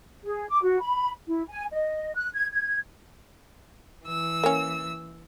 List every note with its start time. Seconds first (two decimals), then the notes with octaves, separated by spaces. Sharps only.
0.24 G#4
0.48 D6
0.63 F#4
0.80 B5
1.27 E4
1.48 G#5
1.73 D#5
2.14 F#6
2.34 G#6
2.51 G#6
4.04 E3 E6
4.44 A#3 C#4